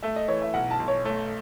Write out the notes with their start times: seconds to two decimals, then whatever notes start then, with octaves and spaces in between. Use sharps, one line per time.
0.03 A3 E5
0.16 D#5
0.28 E3 C#5
0.42 E5
0.54 B1 F#5
0.71 A5
0.80 B1
0.88 C#5
1.05 A3 C#5